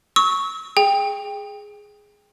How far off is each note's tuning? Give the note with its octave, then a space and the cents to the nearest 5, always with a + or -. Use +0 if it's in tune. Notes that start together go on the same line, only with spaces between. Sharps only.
C#6 +0 E6 -35
G#4 +0 G5 +20